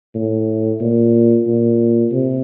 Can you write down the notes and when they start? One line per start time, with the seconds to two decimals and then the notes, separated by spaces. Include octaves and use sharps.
0.15 A2
0.81 A#2
1.47 A#2
2.12 C3